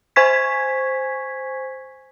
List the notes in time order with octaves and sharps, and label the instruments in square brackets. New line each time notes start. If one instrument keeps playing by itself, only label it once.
[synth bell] C5 G#5 C#6 G#6 B6